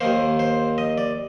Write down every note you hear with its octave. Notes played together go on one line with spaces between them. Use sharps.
D#2 D#3 A#3 C5
C5
D#5
D5